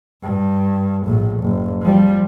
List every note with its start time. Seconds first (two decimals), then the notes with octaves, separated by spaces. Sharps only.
0.23 G2
1.06 A#1 A2
1.41 F#1
1.82 F3 G3